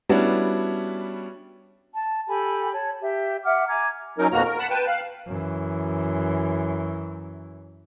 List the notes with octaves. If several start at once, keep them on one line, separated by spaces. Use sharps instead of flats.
G3 B3 C#4 D4 E4 F#4
A5
G4 A4 G#5 B5
C#5 A5
G4 E5
E5 F#5 D6 F6
G#5 A#5 D6 G#6
F#3 C#4 D#4 A#4
F2 B2 A#3 F#4 A#5 F6
A#4
F#5 A5 B5
B4 G5 A5
F5 F#6
F#2 E3